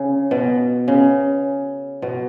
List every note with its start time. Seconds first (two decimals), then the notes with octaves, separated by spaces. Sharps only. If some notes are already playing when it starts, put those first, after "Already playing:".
Already playing: C#3
0.31 B2
0.88 C#3
2.02 B2